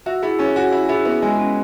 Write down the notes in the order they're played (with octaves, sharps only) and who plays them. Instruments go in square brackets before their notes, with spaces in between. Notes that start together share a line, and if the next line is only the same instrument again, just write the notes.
[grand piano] F#4 [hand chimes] E5
[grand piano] E4 [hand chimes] G#4
[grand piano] C#4 [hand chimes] G#4
[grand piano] F#4 [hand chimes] G#5
[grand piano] E4 [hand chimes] E5
[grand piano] E4 [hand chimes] G#4
[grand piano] B3 [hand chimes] E5
[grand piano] G#3 [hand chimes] G#5
[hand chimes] C#4